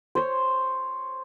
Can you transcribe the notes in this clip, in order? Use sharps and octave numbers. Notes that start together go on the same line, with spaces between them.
C5 C#5